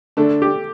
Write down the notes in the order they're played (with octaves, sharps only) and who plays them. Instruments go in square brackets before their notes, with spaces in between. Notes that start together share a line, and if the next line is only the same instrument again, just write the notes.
[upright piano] D3 D4 [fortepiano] A3
[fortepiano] G4